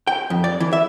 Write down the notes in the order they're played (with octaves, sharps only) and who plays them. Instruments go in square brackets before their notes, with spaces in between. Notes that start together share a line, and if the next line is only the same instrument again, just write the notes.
[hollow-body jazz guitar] G5
F2
D5
E3
E5